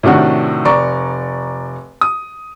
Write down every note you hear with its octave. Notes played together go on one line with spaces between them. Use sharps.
A2 C3 D#3 D4 F#4
F1 D5 A#5 C#6
D#6